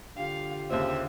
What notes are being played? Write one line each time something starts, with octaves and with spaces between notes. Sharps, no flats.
D3 F4 G4 F5
D#2 C#3 C4 E5